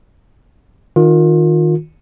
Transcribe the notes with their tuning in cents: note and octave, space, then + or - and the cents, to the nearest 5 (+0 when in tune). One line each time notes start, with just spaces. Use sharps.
D#3 +0 F4 +30